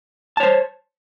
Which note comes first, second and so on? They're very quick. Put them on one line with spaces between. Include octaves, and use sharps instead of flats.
A5 C#5 C5